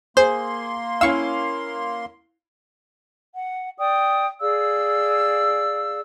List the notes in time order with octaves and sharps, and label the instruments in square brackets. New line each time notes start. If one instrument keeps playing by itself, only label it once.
[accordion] A#3 C6 [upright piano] G#4 [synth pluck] C5
[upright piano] C#4 E4 F5 [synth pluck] C#6 E6
[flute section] F#5
D5 G5 D#6
G#4 D5 F5 E6